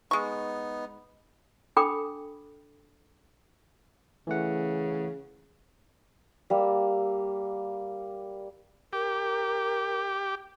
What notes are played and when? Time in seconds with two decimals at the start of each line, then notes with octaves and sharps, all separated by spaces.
0.11 G#3 B3 D#4 C#6
1.76 D4 A4 G5 B5 D6 D#6
4.27 C#3 E3 A3 F#5
6.50 G3 A#3 E6
8.93 G4 A#4